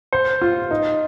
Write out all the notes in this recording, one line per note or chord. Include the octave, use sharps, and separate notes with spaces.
C5
F4
D#4